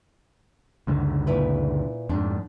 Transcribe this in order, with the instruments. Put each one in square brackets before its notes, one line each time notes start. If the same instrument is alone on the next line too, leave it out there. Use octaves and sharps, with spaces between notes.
[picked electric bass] C#2 F#2 D3
[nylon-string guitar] A#2 E4 B4
[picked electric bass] F2 G#2 [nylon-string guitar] D4